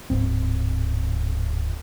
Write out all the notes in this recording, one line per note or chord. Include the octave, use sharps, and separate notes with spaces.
D1 G#2 C4